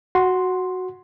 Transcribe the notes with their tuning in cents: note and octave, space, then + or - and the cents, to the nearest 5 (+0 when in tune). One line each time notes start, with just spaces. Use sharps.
F#4 -5 C6 +0